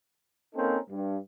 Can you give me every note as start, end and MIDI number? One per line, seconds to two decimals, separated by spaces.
0.55 0.77 58
0.55 0.77 60
0.55 0.77 61
0.55 0.77 63
0.55 0.77 69
0.55 0.77 70
0.90 1.17 43